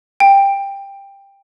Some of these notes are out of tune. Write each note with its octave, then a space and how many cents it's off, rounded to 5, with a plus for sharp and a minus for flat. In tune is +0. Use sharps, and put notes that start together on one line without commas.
G5 +15